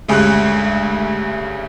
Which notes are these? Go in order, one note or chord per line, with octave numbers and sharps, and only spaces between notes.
D2 G2 C#3 G#3 F#6